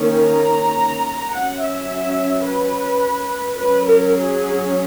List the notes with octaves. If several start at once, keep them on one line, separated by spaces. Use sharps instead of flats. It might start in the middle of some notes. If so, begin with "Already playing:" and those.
Already playing: D#3 A#3 C#4
A#5
F#3 C#4 F#5
E5
B4
F#3 C#4 B4
A#4
G#4